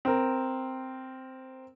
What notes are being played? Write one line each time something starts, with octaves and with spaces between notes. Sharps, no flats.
C4 A#4